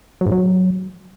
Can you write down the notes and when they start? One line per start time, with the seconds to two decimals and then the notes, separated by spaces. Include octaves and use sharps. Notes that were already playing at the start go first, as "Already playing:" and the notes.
0.21 F#3
0.26 G#2
0.32 F#3